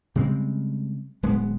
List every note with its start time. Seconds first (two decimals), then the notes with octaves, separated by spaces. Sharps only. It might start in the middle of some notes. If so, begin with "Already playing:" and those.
0.15 C#3 G3 G#3 C4
1.23 D1 G#3 A#3 B3